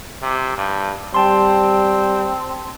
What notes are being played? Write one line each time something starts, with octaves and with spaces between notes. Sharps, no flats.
C3
G2
G3 C4 G5 A5 C6